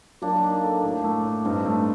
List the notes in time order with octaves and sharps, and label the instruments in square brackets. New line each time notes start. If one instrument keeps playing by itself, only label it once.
[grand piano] F#3 [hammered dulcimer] A#3 D4
[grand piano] D#4
A4
A2
A3
A2
[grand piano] G2 [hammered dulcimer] C4 D#4
[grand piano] A3